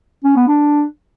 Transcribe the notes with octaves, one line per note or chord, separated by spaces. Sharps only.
C#4
B3
D4